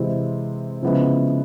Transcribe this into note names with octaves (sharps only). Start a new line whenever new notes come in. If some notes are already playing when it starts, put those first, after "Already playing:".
Already playing: C3 E3 G#3 C4 E4
C#3 F3 G#3 B3 E4